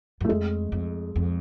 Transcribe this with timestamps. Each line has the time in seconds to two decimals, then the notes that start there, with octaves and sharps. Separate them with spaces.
0.21 F#2
0.25 A3
0.29 F2 G#3
0.72 F2
1.16 F2